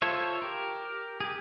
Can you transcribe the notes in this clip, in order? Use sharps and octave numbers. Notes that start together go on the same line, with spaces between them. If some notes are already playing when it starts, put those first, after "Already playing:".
F4 A4 C5 C#5 E5
G4 A#4
G4 G#4